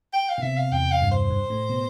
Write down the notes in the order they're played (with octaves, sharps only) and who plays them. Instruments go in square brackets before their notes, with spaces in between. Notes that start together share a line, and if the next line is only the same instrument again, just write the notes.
[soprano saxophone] G5
F5
[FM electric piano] B2
[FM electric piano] C3 [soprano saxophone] E5
[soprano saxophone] F5
[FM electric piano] E2 [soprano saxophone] G5
[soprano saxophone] F5
[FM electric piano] G2
[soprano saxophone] C5
[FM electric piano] G2
A2
B2